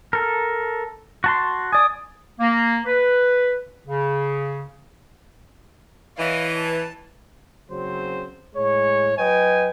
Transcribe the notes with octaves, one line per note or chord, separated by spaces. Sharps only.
A4 A#4
F#4 A5 C6
D5 G#5 D#6
A#3
B4
C#3
E3 C#5 D#5 F5
A5
F#1 C#3 F#3 C4 C5
A2 G#3 C#5
F#3 B4 D#5 G5 G#5